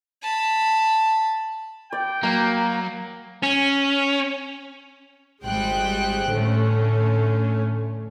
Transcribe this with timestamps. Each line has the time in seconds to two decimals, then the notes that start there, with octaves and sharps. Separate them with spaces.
0.22 A5 B5
1.93 D5 G5
2.23 F#3 A#3 A#5
3.43 C#4
5.44 G#1 G3 G#3 C5 G5 F#6
6.30 A2 D3 A3 C#4